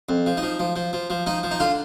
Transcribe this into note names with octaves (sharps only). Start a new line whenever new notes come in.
F2
F3
D#4
F3
F3
F3
F3
F3
F3 D#4
F3
D#4
D3 F4